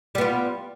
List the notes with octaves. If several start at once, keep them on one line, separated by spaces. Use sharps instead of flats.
G3 B3 F4